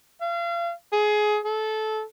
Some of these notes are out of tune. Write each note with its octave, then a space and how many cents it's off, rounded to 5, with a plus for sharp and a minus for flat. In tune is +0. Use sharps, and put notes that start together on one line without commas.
F5 -35
G#4 +20
A4 -20